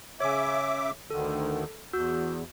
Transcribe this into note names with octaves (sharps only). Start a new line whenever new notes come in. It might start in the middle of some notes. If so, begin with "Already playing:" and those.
C#3 C#5 E5 G#5 D6
D2 D3 D#3 A4
E2 F#4 E6 G6